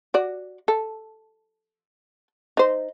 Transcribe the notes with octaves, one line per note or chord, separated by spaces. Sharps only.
F#4 D5
A4
D#4 C5